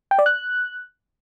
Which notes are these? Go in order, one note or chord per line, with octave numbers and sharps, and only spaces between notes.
G5
D5
F#6